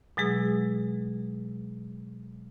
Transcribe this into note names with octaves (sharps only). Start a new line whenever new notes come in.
B2 F#3 G#3 G#4 E6